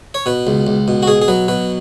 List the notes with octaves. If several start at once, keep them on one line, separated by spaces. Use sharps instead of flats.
C#5
B2 B4
C#2
C#2
B2
F#4
B2 G#4
G#4
F#3 B4
B2 B4